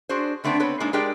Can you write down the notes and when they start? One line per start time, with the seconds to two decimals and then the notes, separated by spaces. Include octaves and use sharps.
0.09 D4 F#4 G#4 C5
0.44 D3 A3 B3 C4 D4
0.60 B3 C4 A4 B4 C#5
0.80 A#2 G#3 A#3 D4 D#4
0.93 G#3 D4 G4 A#4 D5 G5